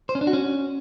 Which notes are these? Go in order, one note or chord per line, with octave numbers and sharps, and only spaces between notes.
C5
C#4
D4
F#4
C#4